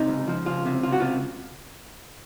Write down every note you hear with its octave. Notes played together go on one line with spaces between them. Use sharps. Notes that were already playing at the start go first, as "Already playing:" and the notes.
Already playing: C3 D#4
C#2
F3
C#2 F4
C3
C#2 F4
F#4
C3 F4